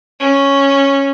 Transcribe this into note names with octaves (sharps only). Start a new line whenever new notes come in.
C#4